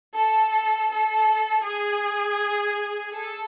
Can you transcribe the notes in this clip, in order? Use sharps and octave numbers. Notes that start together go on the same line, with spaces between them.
A4
A4
G#4
A4